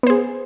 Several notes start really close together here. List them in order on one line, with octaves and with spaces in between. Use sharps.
B3 C5 G#4